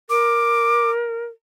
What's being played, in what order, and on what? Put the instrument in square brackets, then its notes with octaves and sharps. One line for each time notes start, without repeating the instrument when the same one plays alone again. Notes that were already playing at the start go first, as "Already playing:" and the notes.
[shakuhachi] A#4 [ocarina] D6